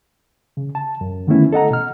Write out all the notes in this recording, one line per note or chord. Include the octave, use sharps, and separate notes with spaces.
C#3
A5
F#2
D3 D#3 A3 B3 C#4 E4
A4 D#5 F#5 A#5
B2 F6